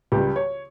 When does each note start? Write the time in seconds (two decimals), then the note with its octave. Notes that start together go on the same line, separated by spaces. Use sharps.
0.12 C#2 C#3 G3 G4
0.36 C#5